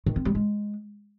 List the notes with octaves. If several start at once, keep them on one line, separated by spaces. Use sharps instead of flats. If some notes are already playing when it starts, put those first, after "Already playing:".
D#3
C4
G3
G#3